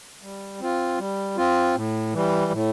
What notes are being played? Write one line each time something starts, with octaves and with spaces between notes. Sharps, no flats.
G3
C4 F4
G3
C4 F4
A2
E3 G3
A2